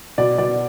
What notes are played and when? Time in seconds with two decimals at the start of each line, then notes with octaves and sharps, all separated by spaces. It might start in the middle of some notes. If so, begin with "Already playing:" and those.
0.18 B2 D5
0.38 B2 D5